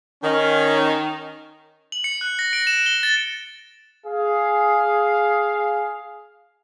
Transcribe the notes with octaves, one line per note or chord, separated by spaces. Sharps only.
D#3 C#4
F#7
C#7
F#6
A#6
D7
E7
G7
A6
G#4 F5